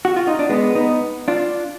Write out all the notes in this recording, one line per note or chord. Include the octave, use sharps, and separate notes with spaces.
F#4
F4
D#4
D4
G#3 B3
B3 D#4
D4 F4